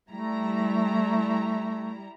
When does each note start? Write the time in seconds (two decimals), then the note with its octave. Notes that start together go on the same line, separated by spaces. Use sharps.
0.11 G3 A3 E4 A#5